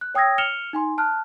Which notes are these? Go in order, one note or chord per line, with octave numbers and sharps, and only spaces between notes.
F#6
C#5 G5 D#6 E6 G#6 A#6
F6 C#7 E7 F7 G7
D#4 G#5 C6
A5 F6 F#6